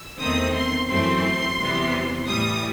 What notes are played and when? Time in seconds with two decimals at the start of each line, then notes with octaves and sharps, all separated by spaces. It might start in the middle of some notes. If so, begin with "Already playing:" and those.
Already playing: E6
0.19 E2 D#3 A3 C4 D#6
0.54 C6
0.88 F#2 E3 A3 C4 C6
1.57 E2 C3 E3 G3 B3
2.26 A2 E3 G3 D#6